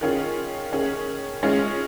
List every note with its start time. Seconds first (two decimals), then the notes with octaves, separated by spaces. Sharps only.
0.01 D#3 C#4 F4 G#4
0.72 D#3 C#4 G#4
1.43 G#3 C#4 F4 G#4